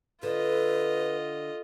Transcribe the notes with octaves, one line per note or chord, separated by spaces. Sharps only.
D3 F4 B4 D#5